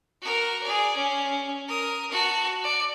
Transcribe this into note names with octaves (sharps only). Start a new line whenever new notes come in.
F#4 A#4
G#4 D5
C#4
A#4 D#6
F#4 A5
D5